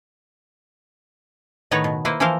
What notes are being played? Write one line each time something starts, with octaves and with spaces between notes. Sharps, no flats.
A2 D#3 B3 B4 C#5 A#5
B2
A#3 E4 B4 C5
E3 F3 E4 A#4 C5 F5